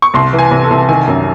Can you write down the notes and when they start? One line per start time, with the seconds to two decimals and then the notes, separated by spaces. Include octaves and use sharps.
0.02 C#6
0.14 C2 C6
0.33 E3
0.39 G#5
0.51 C2
0.64 A4
0.71 C2
0.89 D#3 G#5
1.07 F#2